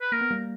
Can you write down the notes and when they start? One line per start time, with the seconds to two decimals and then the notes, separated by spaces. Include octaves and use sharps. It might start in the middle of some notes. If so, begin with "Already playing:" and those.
0.01 B4
0.12 A#3 A#4
0.21 B3
0.31 G3 A#3